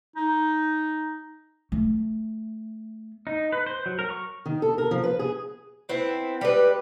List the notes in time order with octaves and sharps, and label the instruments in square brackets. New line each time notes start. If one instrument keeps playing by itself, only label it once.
[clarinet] D#4
[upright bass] A3
[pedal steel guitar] D#4
B4
C5
F#3
A#4
C#6
[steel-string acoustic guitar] D#3
A4
A#4
F3
B4
G#4
[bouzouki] B3 C4 E4
G3 G#3 B4